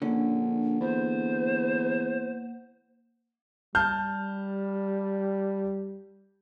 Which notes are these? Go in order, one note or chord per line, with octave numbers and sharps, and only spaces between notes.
A#1 D3 A#3 C#4 F#5
E2 C5
G3 A5 F6 G6